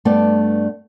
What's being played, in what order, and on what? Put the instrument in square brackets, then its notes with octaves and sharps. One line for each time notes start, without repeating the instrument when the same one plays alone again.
[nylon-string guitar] G2 A3 B3 D5